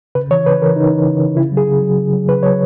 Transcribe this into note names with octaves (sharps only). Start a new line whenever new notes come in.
C#3 B4
E3 C#5
C#3 B4
E3 A#4
C#3 D#4
E3
C#3
E3
C#3 E4
F#3
G#4
C#3
F#3
C#3
F#3
C#3 B4
F#3 C#5